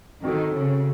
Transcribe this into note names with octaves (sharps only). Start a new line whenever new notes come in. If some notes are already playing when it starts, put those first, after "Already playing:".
D#3 C4 F#4 A4
C#3